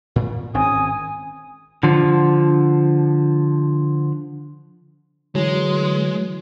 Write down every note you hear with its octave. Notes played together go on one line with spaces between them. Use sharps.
A#2
G#1 C4 C#4 G#5 D#6
D3 F3
D3 E3 F#3 G#3